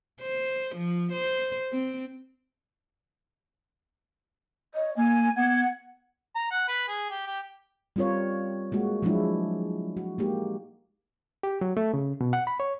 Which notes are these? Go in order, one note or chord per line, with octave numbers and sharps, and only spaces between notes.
C5
F3
C5
C4
C#5 D#5
A#3 G#5 G#6
B3 F#5 G#6
A#5
F#5
B4
G#4
G4
G4
G3 C4 F4 A#4 C#5
G#3 A#3 F#4
F3 F#3 G#3 D4 E4
F#4
G#3 A#3 D#4 G4
G4
F#3
A3
C#3
B2
F#5
B5
C#5